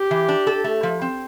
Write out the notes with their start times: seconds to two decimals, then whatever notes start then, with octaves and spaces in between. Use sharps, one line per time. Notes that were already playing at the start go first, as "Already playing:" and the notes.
Already playing: G4
0.11 E3
0.28 D4
0.47 A4
0.64 A3
0.83 F3
1.01 C4